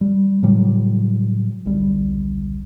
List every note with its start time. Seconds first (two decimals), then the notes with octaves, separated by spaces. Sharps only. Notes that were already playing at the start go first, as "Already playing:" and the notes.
0.01 G3
0.42 A2 C#3 F#3 G3
1.65 D#1 B1 D3 G3